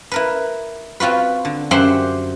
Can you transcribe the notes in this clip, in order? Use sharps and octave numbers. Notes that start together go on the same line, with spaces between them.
E4 A#4 B4
C4 F4 F#4 B4
D3
F#2 G4 C5 E5 F#5 C6